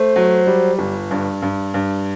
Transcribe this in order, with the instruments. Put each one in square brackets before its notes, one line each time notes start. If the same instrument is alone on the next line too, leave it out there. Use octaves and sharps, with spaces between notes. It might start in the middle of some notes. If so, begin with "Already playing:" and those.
Already playing: [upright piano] A3 [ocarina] C5
[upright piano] F#3
G3
G1
G2
G2
G2